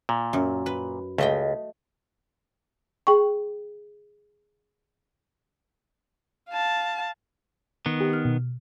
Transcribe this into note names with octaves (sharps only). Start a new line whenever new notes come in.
A#2
F#2
B4
C#2 A3 D#5 G5
G#4 G5 C#6
F5 A5
D#3 B3
G4
F6
B2